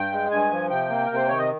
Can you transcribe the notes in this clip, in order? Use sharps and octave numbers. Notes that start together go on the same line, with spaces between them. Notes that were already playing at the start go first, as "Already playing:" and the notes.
Already playing: G2 G5
G#3
G2 G#5
F3
C3 G5
A#3
C3 A#4
C5
D#3 C#5
D#5